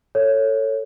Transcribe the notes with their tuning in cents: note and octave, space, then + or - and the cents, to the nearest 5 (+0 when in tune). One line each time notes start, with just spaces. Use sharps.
A4 +20 C#5 +0